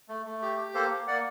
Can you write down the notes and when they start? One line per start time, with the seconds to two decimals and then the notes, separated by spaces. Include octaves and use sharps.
0.09 A3
0.26 A3
0.42 G4
0.58 G4
0.74 A#3 A4 C5
0.91 A#3
1.07 A#3 D5 F#5